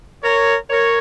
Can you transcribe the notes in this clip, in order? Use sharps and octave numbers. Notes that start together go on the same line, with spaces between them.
A#4 C#5
A#4 C#5